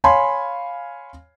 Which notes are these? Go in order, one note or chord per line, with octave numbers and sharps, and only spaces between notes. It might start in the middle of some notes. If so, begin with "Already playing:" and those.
C#5 F5 G#5 B5 C6